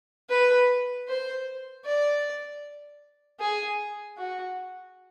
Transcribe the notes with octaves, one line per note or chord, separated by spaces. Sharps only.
B4
C5
D5
G#4
F#4